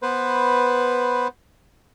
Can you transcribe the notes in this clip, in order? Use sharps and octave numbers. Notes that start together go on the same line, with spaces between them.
B3 B4 C5